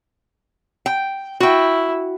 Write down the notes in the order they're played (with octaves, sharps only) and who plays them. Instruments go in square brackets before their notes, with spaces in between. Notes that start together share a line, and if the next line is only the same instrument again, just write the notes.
[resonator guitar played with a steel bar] G5
[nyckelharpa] E4 [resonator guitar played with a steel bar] F#4 G5